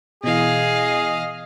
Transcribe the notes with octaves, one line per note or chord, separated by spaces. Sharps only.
B2 E3 G#4 D#5 F5